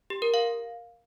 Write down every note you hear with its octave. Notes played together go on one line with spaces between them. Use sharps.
G4
A#4
F5